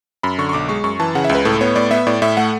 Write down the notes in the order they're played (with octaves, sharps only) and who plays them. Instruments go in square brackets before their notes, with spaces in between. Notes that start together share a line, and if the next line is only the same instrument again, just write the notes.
[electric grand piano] F#2 B5
D3 C#6
C#6
B1 D6
G#3 C#6
F#2 C#6
E3 A5
C#3 F#5
E5
C#2
B4
A2 A4
B3 C#5
A2 D5
B3 E5
A2 D5
A2 E5
A3 F#5